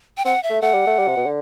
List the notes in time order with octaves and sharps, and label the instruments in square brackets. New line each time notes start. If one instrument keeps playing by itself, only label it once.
[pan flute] G5
[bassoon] C4 [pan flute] F#5
[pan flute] E5
[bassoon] A3
[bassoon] A3 [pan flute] F#5
[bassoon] G3
A3
G3
C3
B2
D3